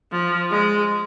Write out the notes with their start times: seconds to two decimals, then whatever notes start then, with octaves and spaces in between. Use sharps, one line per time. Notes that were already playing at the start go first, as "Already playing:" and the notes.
0.12 F3
0.51 G#3